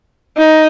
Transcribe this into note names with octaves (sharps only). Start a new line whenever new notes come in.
D#4